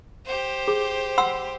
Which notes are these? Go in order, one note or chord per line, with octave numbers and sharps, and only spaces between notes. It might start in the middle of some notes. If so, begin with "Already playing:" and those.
G4 C5
G#4
F#5 C6 E6